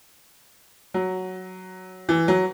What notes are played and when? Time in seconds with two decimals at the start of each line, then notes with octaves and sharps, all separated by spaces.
0.94 F#3
2.09 E3
2.28 F#3